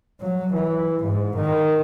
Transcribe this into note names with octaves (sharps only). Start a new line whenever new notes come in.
F#3
E3
G#2
D#3